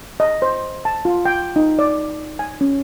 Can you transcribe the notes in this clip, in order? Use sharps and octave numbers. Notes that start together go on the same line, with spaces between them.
D#5
C5
A5
F4
G5
D#4
D5
G#5
C#4